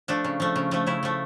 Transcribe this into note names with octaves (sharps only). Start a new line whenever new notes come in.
F3 A3 D4
C#3
F3 A3
C#3
F3 A3
C#3 E4
F3 A3